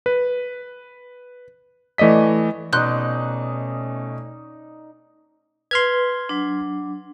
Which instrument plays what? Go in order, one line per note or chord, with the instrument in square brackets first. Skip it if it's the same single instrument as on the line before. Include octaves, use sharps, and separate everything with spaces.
[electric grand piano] B4
E3 A3 D5 D#5 B6
[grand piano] B2 [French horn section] A3 C#4 [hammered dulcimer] D#4 D5 [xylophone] C6 F#6 G6
[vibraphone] B4 [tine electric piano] C6 F6 G#6
[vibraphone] F#3 D4